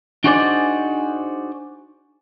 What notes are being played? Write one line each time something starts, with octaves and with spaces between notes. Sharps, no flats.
D4 D#4 F#4 G#4 C5 D5